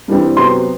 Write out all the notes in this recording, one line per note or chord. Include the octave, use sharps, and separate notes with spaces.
G2 E3 G3 C4
C3 F#3 B3 C6